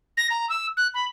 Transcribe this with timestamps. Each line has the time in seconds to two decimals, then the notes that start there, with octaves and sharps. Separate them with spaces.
0.17 A#6
0.30 A#5
0.49 E6
0.77 F#6
0.94 B5